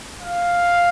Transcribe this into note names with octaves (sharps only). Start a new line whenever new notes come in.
F5